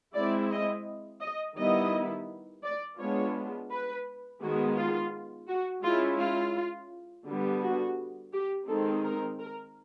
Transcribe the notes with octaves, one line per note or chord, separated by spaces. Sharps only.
G#3 C4 E4 D5
D#5
D#5
D#3 G3 B3 E4 D#5
D5
G#3 B3 D4 F4 C#5
B4
D#3 G#3 B3 F#4
F4
F#4
G#3 C#4 E4 F4
F4
D3 G3 B3
F#4
G4
D#3 G#3 C4 D#4 A4
A#4
A#4